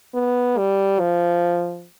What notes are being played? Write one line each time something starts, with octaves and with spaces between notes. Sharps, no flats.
B3
G3
F3